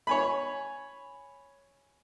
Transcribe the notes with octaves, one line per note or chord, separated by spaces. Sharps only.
C#5 G#5 B5